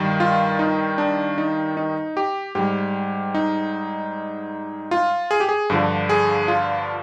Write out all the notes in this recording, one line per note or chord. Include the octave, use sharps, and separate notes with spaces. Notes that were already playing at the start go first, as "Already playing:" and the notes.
Already playing: G2 D#3 G3
F4
D#4
D4
D#4
D#4
G4
G#2 G3 G4
D#4
F4
G#4
G4
G#4
G2 D3 F3
G#4
F4